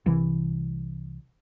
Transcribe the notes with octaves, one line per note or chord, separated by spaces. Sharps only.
C2 E3